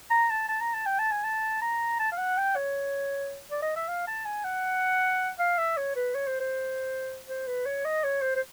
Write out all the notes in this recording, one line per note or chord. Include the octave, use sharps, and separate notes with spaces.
A#5
A5
A5
A#5
A5
G5
A5
G#5
A5
A#5
A5
F5
F#5
G5
C#5
D5
D#5
E5
F5
A5
G#5
F#5
F5
E5
C#5
B4
C#5
C5
C5
C5
B4
C#5
D#5
C#5
C5
C5